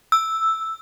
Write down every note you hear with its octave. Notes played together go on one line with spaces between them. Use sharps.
E6